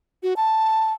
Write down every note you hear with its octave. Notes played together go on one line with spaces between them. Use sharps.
F#4
A5